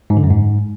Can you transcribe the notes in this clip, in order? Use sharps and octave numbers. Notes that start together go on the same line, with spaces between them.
G#2
D3
F#2
G#2